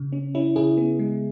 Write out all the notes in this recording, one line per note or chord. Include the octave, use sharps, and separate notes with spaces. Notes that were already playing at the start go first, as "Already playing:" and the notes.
Already playing: C#3
C#4
C#4 E4
C#3 E4 G#4
B3
G#3